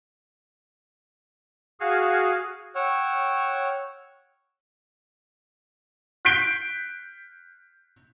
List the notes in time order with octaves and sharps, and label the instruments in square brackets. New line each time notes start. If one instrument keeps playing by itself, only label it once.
[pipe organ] F#4 G#4 F5
[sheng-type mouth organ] C#5 F#5 G5 C#6 E6 F6
[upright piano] F#6 G6 B6 C7 D7 G7